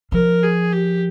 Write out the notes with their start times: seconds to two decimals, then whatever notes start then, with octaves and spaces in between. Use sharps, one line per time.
0.12 F3 A#4
0.43 G#4
0.73 G4